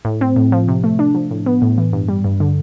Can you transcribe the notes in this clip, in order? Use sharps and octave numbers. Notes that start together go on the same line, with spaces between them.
A2
C4
A2
F3
C3
A3
D4
F3
A2
B3
A2
E3
G2
G3
G2
D3